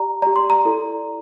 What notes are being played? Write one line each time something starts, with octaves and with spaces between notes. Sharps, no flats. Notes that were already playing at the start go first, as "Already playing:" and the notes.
Already playing: G4 D5 A#5
G4 D5 A#5
C6
A#5
E4 A4 D5